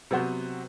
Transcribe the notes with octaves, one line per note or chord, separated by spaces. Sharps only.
C3 F#3 B3 F#4 C5